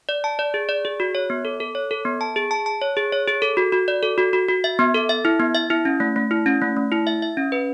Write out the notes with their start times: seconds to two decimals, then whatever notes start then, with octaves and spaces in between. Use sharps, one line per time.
0.09 D5
0.24 A5
0.39 D5
0.54 G#4
0.69 D5
0.85 G#4
1.00 F#4
1.15 C#5
1.30 B3
1.45 A4
1.60 A4
1.75 C#5
1.91 A4
2.05 B3
2.21 A5
2.36 G#4
2.51 A5
2.66 A5
2.81 C#5
2.97 G#4
3.12 C#5
3.28 G#4
3.42 A4
3.57 F#4
3.72 F#4
3.88 D5
4.03 A4
4.18 F#4
4.33 F#4
4.48 F#4
4.64 E5
4.79 B3
4.94 A4
5.09 E5
5.25 E4
5.40 B3
5.55 E5
5.70 E4
5.85 C#4
6.00 A3
6.16 A3
6.31 E4
6.46 C#4
6.61 A3
6.77 A3
6.92 E4
7.07 E5
7.22 E5
7.37 C#4
7.52 B4